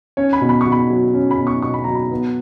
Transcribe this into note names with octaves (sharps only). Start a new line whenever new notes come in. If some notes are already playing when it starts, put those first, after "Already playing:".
C#4 C#5
B5
B2
B5
C#6
B2
B5
F#3
C#4
B5
B2
C#6
B2 C#6
B5
F#3 A#5
B5
B3